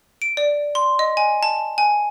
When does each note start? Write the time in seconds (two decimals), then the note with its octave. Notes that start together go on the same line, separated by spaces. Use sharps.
0.22 D7
0.37 D5
0.75 C6
0.99 D#5
1.17 G#5
1.43 A5
1.78 G#5